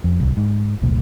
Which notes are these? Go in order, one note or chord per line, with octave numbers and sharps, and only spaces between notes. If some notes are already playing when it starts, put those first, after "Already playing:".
F2
D1 C2
G#2
E1 C2 A#2